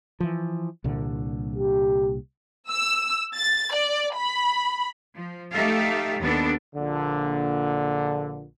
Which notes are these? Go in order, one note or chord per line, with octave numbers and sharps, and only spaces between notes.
E3 F3
C2 A#2 D3
G4
E6
A6
D5
B5
F3
A3 D#4 G4 A4 E5 F5
D#2 B3 D4 A4
A#1 A#2 D3